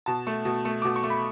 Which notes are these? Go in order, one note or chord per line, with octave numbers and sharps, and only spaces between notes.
B2 A5
A3
B2
A3
B2 D6
C#6
A3
B5